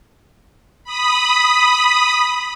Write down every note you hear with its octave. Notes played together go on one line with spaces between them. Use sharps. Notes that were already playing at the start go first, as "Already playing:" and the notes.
B5 D#6